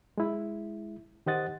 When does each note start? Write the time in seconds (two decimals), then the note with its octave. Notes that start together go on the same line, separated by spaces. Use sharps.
0.18 G#3 E4
1.26 D#3 G4 C5 D#5 F#5 A6